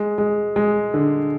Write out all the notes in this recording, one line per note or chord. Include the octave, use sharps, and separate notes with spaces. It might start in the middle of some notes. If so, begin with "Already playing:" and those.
Already playing: G#3
G#3
G#3
D3